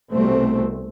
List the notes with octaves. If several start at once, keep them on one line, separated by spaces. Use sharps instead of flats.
C2 B2 A3 C4